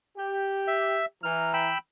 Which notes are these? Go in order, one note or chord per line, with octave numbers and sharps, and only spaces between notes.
G4
E5
E3 A#5 F6
G5 B5 E6